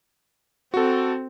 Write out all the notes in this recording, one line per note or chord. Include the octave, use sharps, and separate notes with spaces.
C4 F#4 A4